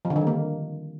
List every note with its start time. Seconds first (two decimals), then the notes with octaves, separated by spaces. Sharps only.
0.05 F3
0.10 D3
0.16 D#3
0.21 G3
0.27 A#3